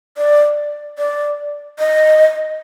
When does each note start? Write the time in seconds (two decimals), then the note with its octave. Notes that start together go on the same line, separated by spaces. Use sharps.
0.17 D5
0.98 D5
1.79 D#5